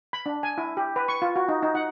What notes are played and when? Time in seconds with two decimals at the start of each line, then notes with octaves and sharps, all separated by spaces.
0.13 B5
0.26 D4
0.43 G#5
0.58 E4
0.77 G4
0.96 B4
1.08 C#6
1.22 F4
1.36 F#4
1.48 D#4
1.62 D#4
1.75 F#5